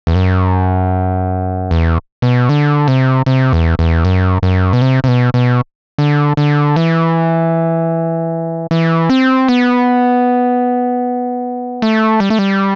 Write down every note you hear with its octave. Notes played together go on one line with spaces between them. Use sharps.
E2
F#2
E2
B2
D3
C3
C3
E2
E2
F#2
F#2
B2
C3
C3
B2
B2
D3
D3
E3
E3
C4
B3
A3
G3
A3
G3